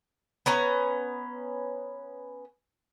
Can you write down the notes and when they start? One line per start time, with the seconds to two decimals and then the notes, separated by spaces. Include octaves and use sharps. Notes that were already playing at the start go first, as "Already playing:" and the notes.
0.46 B3 C#4 A#5